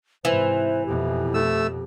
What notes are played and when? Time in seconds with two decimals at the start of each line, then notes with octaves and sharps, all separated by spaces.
0.25 G#2 C3 E3 C5
0.86 F2 B2 G4
1.34 A3 E6